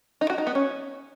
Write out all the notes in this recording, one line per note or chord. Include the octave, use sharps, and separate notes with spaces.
D#4
F#4
D#4
B3
C#4